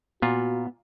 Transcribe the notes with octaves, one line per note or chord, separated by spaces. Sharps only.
A#2 B3 F4 F#4